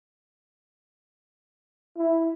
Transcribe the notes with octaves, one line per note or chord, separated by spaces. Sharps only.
E4